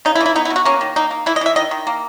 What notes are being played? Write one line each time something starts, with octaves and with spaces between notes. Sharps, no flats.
C#3 D#4
E4
E3
E4
B3 D#4
E4
B2
F#4
A#3 C#4
D#3
A#3 D#4
A#3
E3 E4
D#5
E3 E5
D#3 D#5
D#3
A#3